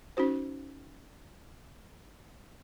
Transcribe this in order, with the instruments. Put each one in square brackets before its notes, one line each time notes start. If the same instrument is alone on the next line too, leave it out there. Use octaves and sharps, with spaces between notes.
[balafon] C#4 D#4 F#4 C5